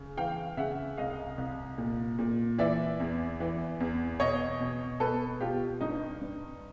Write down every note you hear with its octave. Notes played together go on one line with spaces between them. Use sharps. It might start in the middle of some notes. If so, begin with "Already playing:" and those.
Already playing: C#3
E3 F5 G5
C#3 E5 F#5
C2 D#5 F5
C2
A#2
A#2
E3 D5 E5
E2
E3
E2
B2 C#5 D#5
B2
B2 A4 B4
B2 F4 G4
G2 D#4
G2